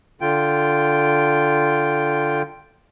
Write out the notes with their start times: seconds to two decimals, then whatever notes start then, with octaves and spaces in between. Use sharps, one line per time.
0.21 D3 F4 G5